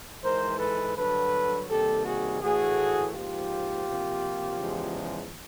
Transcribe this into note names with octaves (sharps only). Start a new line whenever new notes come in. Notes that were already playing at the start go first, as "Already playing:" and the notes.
G#2 E3 G#3 A#4 C5
A4 B4
G2 D3 F#3 A4 B4
C3 D#3 G3 A#3 G4 A4
F#4 G#4
A2 E3 A3 F#4 G#4
G#2 F3 A#3 F4 G4
C3 F3 A#3
E2 C#3 F3 G#3